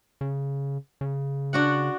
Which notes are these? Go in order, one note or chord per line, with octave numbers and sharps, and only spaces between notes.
C#3
C#3
D4 F#4 F#5